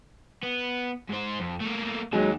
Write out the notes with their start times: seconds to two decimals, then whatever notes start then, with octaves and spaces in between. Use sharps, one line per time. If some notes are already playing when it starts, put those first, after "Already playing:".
0.43 B3
1.09 G#2 C5
1.40 F2
1.60 A3 A#3
2.13 D#2 D#3 F#3 G#3 G#4